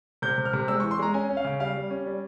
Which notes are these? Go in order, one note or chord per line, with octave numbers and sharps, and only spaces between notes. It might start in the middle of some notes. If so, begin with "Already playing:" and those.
C3 G6
C3
F6
C3
G#3 E6
C#6
E3
C6
G#3 A#5
C#4 G#5
C#4
F5
C#3
G3 F5
G3
C#4
G3